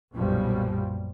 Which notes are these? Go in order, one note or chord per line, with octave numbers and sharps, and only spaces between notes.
B1 F#2 A#2 F3 G3